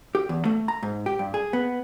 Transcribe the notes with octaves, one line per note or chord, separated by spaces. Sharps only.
G4
E2
A3
A#5
G#2
G4
G2
G#4
B3